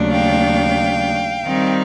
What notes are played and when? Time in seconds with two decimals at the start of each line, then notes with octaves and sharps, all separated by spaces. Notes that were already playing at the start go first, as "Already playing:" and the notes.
Already playing: D#2 C#3 F#3 A3 D4
0.11 F5 G5
1.47 D#3 G3 C4 D#4